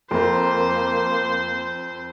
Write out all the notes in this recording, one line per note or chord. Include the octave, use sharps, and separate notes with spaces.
F2 A#3 A#4 C5 C6